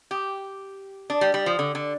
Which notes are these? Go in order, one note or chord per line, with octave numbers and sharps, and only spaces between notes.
G4
D4
G3
G3
F3
D3
D3